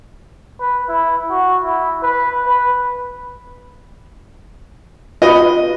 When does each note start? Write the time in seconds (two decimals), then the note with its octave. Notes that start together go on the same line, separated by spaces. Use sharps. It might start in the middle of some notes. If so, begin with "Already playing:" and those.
0.60 B4
0.89 E4
1.31 F#4
1.63 E4
2.03 B4
2.45 B4
5.22 F4 F#4 B4 D#5